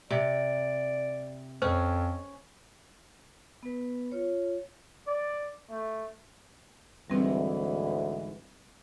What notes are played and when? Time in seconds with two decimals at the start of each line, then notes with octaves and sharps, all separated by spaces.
0.10 C3 D5
1.62 F2 C#4 C5
3.63 B3 B4
4.12 F4 C#5
5.07 D5
5.70 A3
7.10 D2 G#2 E3 G3 C4 B4